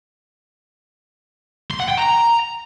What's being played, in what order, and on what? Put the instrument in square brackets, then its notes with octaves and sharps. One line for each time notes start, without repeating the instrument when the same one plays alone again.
[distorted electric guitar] C6
F#5
G5
A#5